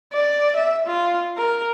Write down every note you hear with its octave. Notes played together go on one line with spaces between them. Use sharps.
D5
E5
F4
A#4